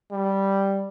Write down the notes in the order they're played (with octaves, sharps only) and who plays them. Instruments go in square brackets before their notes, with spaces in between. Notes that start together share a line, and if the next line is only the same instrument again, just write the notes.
[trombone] G3